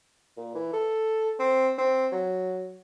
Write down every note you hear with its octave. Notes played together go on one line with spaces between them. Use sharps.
A#2
E3
A4
C4
C4
F#3